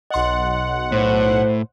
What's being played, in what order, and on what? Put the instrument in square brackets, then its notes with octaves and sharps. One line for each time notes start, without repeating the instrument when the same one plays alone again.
[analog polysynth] B1 F#5 [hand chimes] D#5 C6
[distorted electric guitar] A2 [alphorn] C5